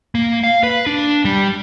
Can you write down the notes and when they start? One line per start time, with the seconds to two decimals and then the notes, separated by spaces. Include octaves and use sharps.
0.15 A#3
0.43 F5
0.63 B4
0.86 D4
1.25 G3